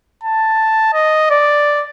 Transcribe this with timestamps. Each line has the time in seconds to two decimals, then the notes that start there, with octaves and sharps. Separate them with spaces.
0.24 A5
0.93 D#5
1.30 D5